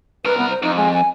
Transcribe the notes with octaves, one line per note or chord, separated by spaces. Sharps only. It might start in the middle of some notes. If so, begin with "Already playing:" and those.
C2 A#4 B4
B3
C5
F2 D#4
G#3
G#5